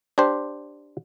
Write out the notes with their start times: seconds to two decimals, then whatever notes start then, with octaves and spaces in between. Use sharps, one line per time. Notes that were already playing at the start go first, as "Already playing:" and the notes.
0.18 D4 G4 C5